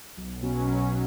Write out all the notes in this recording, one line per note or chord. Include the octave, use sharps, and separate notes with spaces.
B1
B2 F#3 C#4
B1